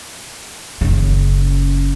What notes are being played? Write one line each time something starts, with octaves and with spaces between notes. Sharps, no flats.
F#1 C#3